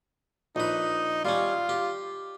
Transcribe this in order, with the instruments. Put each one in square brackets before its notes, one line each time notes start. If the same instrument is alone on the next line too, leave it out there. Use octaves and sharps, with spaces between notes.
[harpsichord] A#1 B4 [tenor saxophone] D#4
[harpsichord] G3 C#4 [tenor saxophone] F4
[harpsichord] G4